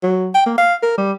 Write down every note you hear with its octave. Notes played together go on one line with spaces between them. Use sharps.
F#3
G5
A#3
F5
A#4
G3